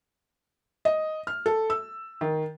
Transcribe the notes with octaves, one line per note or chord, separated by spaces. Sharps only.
D#5
F6
A4
E6
D#3